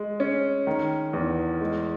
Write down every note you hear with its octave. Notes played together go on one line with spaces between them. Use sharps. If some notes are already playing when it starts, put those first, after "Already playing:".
Already playing: G#3
C#4
D#3
E2
G#3